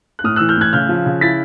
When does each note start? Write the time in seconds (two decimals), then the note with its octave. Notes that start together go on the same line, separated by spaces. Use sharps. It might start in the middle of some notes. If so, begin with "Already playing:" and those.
0.19 F#6
0.24 A2 D#6 F6
0.36 E3 E6 F#6
0.49 F6 G6
0.57 A2 F#6 G#6
0.73 C#3 F6 G6
0.89 F3
1.06 C#3
1.21 E4 A6 B6